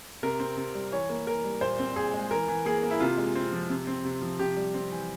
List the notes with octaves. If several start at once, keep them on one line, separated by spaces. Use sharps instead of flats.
C3 A#4
C4
C3
G3
E3 C#5
A#3
E3 A#4
G3
A#2 C5
C4
A#2 G#4
G#3
E3 A#4
E3
A#3 G#4
A#3
E4
C3 F4
G#3
C4
F3
C3
C4
C3
F3
C3 G4
G3
C4
E3